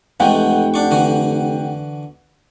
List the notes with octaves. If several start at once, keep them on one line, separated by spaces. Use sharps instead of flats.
F1 E3 G#3 A3 F#5 G5
D4 C#6
D3 E3 F#4